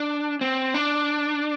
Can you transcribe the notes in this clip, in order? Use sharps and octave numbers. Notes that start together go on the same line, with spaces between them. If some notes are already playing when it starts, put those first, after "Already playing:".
Already playing: D4
C4
D4